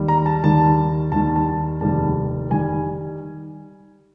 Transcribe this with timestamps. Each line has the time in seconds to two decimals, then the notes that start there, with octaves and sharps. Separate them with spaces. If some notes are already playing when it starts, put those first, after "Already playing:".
Already playing: D#2 D#3 G3
0.08 A#5
0.26 A5
0.44 D#2 D#3 G3 A5
1.12 D#2 D#3 G3 A5
1.36 A5
1.81 F1 D#2 D#3 G3 A5
2.50 D#3 G3 G#5